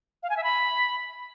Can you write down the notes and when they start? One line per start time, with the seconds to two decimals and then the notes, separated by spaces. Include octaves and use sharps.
0.23 F5
0.30 G#5
0.37 E5
0.43 B5